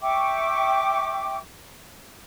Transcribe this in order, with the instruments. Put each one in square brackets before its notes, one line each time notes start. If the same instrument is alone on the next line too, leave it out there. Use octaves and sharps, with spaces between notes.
[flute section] E5 G5 C#6 D6